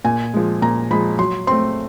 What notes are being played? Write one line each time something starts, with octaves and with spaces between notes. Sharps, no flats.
A#2 G#5
F3 G#3
A#2 A#5
F3 G#3 B5
F#3 C6
A3 C4 C6